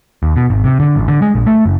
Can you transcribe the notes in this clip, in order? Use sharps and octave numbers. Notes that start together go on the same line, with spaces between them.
D#2
B2
G#1
C3
D3
A1
D3
G#3
A#1
A3
F#1